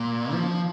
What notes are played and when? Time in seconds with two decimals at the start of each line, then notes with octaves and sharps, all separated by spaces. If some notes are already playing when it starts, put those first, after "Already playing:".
Already playing: A#2
0.33 F3